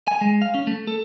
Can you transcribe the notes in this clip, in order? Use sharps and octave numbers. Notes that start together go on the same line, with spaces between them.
G#5
G#3
F5
C#4
A3
A4